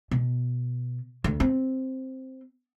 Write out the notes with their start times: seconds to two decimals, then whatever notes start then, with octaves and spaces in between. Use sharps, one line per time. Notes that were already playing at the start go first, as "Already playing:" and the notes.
0.11 B2
1.24 D2
1.40 C4